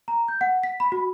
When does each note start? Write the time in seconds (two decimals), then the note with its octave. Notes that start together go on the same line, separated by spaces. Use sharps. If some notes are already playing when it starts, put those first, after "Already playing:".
0.08 A#5
0.28 G6
0.41 F#5
0.63 B6
0.80 B5
0.92 F#4